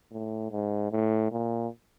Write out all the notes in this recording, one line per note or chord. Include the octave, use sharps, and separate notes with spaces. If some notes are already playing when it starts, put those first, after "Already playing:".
A2
G#2
A2
A#2